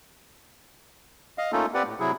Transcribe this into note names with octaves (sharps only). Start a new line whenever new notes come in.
D#5 F5
A3 A#3 C#4 D#4 F4 A4
C4 G4 B4 D5 F#5
A2
C3 F#3 E4 G#4